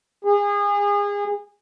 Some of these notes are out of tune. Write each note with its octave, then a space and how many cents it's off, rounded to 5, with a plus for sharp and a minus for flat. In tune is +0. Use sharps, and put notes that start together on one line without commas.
G#4 -30